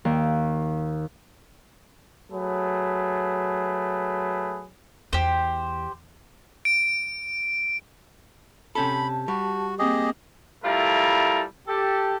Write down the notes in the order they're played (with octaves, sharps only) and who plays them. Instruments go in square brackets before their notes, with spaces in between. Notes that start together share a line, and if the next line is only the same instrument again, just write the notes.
[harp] D#2
[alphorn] F#3 [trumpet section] A3 G#4 B4
[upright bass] E2 [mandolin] G4 C5
[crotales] D7
[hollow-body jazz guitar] C3 C#4 A4 [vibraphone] G4 A5 [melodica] B5
[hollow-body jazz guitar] G3 [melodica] F#4
[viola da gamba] A#3 C4 [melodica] G4 G#4 D#5
[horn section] G3 A3 E4 F4 A4 A#4
G4 A4